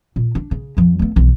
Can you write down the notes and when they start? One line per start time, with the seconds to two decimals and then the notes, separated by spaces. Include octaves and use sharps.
0.16 A#2
0.35 D4
0.51 C#3
0.77 F2 F3
0.99 A3 B3
1.16 B1 E3